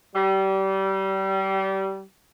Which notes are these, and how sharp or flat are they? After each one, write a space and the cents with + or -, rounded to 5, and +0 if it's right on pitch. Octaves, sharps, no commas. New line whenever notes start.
G3 -25